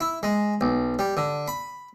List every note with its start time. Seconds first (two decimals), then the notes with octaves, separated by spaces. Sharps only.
0.01 E4
0.23 G#3
0.61 B1
0.99 G3
1.17 D3
1.48 B5